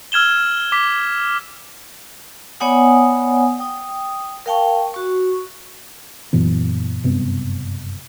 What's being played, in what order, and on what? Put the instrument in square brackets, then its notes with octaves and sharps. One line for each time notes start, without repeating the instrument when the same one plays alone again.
[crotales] E6 F6 G#6 E7 G7
D6 B6
[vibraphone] B3 C#5 D5 F#5 G#5 D#6
G5 D#6
A#4 F5 G5 A5 C#6
F#4 C#6
[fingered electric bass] F#2 A#2 E3 B3
F#1 G2 C3 B3